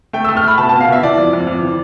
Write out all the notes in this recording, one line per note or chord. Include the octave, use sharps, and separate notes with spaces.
A3 G5
E6
A3
F6
A3 B5
B2 A5
A5
B2
F5
B2 E5
E3 D5
F2
F2
F2
E3